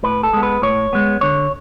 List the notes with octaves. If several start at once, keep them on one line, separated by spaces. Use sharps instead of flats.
A2 B4
A4
G#3 B3
B4
A2 C#5
G#3 B3
D3 C#5